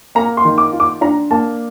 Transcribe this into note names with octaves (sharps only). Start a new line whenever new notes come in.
A#3 A#5
C6
D#3
D6
F4
D6
D4 A#5
A#3 A5